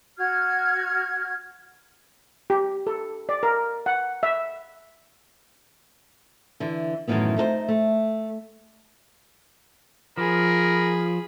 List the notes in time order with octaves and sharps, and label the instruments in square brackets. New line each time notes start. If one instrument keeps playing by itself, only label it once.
[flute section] F#4 F6 G#6
[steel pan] G4
A4
D5
A#4
F#5
E5
[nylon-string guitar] D3 E3
F#2 A2 C3 D#3 E3 B3
A3 D#4 A4 C5
A3
[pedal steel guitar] F3 [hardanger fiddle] G#4 B5 [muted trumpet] A#4